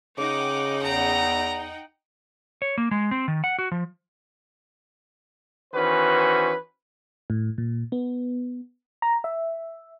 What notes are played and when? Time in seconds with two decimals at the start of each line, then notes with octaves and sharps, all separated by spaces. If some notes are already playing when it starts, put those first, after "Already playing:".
0.18 C#3 D#4 F#5 G5 D6
0.83 E2 A#5
2.62 C#5
2.78 A#3
2.91 G#3
3.11 C4
3.28 D#3
3.44 F#5
3.59 F#4
3.71 F3
5.74 D#3 E3 C#4 F#4 B4 C5
7.30 A2
7.58 A#2
7.92 B3
9.02 A#5
9.24 E5